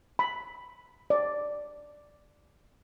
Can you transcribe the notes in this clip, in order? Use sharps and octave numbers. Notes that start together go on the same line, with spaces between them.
B5
D5